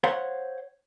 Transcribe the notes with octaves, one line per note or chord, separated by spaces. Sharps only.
C5 C#5 F5 F#5